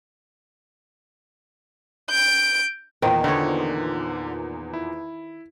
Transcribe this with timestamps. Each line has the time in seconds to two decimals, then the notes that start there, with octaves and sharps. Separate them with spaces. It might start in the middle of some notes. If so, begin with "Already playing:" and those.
2.10 G6 D7
3.02 E2 A#2 D#3 C5
3.24 D3 D#4 C#5
4.73 E4